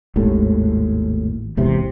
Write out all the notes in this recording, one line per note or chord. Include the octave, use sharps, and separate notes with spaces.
G#1 D#2 A2
G#1 E2 C3